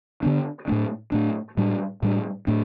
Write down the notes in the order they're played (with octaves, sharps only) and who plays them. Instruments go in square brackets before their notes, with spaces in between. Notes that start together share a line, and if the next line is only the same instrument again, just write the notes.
[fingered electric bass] D3 B3 D4
A2 A3 D4
A2 A3 D4
A2 G3 D4
A2 G3 D4
A2 A3 D4